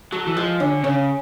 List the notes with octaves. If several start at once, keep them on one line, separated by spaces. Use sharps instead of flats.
F#3 A4
E3
F3 G#3
D3 C#4
C#3 C#4